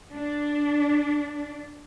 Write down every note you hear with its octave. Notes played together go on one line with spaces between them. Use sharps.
D4